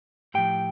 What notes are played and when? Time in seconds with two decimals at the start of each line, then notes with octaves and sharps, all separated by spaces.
0.34 A2 F3 G4 G5